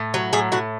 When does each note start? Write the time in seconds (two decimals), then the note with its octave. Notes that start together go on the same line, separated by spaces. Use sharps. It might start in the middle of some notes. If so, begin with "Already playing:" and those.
Already playing: A2
0.14 F#3
0.33 A2 G#4
0.52 A2 F#4